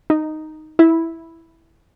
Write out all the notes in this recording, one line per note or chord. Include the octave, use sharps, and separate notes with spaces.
D#4
E4